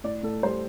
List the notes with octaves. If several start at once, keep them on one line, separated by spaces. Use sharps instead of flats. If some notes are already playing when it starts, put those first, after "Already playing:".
A2 D5
A2 A4
G3 C5